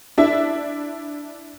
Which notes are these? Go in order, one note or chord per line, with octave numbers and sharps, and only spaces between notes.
D4 E4 E5